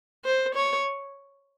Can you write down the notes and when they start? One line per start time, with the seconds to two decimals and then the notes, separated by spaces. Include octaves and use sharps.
0.25 C5
0.55 C#5